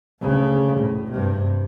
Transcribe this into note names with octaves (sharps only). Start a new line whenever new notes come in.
D2 C#3
A2
G2 C3